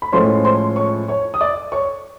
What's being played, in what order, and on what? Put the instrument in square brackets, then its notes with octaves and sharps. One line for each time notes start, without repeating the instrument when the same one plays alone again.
[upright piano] B5
A2 F3 G#3 C#4 F4 C5 C6
C5 C6
C#5 C#6
C#5 C#6
D#6
D5 D6
C#5 C#6